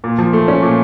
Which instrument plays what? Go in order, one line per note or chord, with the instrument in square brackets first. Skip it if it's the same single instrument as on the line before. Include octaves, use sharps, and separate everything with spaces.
[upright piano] A#2
F3
A3
C#4
A#2